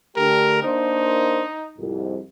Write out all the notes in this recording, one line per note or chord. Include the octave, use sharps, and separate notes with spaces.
D3 A3 G4 A#4
A#3 D4 D#4 C5
C2 F2 G#2